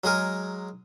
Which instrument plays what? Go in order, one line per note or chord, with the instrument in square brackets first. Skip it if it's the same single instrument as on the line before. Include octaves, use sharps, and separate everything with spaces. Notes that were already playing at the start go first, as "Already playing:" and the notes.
[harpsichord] F#3 G#3 G#4 A#4